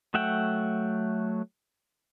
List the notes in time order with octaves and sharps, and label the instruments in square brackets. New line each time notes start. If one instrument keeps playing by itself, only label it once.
[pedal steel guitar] F#3 A3 E5 F#5 G5